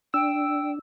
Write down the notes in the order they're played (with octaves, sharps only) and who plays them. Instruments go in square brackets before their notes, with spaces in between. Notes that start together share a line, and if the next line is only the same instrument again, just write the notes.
[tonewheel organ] D4 [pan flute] G5 [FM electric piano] E6